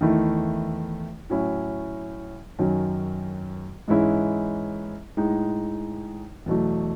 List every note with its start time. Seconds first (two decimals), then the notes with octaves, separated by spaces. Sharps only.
0.01 E2 D#3 A3 E4
1.30 A2 F#3 C#4 E4
2.59 F#2 D#3 F#3 C#4
3.88 G#2 E3 G#3 C#4 E4
5.17 A2 G#3 D#4
6.46 E2 B2 F#3 A3